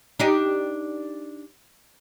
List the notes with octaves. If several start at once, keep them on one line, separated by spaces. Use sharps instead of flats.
D4 D#4 G4